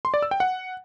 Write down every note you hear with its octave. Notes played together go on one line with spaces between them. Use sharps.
C6
D5
E6
G5
F#5